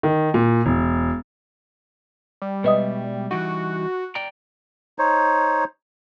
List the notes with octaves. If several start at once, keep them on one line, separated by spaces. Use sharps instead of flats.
D#3
A#2
E1
G3
B2 G#3 B4 D#5 E5 D#6
E3 G3 D#4 F#4
D5 G5 A#5
D#4 C5 C#5